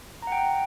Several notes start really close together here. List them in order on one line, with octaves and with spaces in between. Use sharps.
A#5 F#5 G5